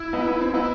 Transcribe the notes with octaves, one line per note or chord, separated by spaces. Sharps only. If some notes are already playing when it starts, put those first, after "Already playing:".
Already playing: E4
B3 D#4
B3
C4
B3 D#4 E4